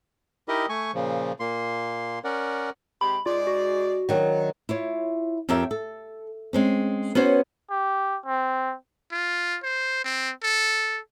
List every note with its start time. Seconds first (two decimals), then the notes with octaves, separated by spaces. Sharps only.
0.48 D#4 E4 G4 A#4 D#5
0.69 A3 G#5 C#6
0.94 A#2 C#3 F3
1.40 A#2 A#3 C6
2.24 C#4 A#4 D5 F#5
3.01 C3 G#3 G4 B5
3.26 G#2 G#3 F4 D5
3.47 F#4
4.09 D#3 F#3 D4
4.69 E4 F4 C#5
5.49 F2 F3 G4 A#4 C#5 E5
5.71 A4
6.53 G#3 C4 C#4
7.15 B3 C#4 F#4 C5 C#5
7.71 G4
8.26 C4
9.12 F4
9.63 C5
10.04 C4
10.43 A4